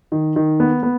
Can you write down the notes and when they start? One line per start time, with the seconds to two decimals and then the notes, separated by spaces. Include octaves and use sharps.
0.12 D#3
0.36 D#3
0.60 B3
0.83 B3